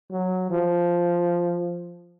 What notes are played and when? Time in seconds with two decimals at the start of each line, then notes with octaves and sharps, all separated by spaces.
0.11 F#3
0.50 F3